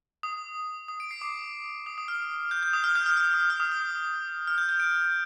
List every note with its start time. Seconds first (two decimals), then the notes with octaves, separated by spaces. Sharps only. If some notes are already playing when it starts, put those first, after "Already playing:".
0.23 D#6
0.88 D#6
1.00 D7
1.11 C7
1.22 D6
1.86 D#6
1.98 D#6
2.08 F6
2.51 G6
2.63 G6
2.73 D#6
2.84 F6
2.95 G6
3.06 F6
3.17 F6
3.34 D#6
3.50 F6
3.60 D#6
3.72 D#6
4.47 F6
4.58 G6
4.69 G6
4.80 D7